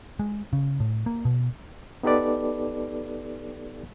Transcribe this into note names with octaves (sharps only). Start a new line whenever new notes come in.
G#3
C#3
A2
A#3
B2
B3 D#4 G4 A4 B4 D5